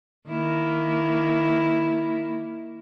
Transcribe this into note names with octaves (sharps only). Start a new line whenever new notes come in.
D#3 A#3 E4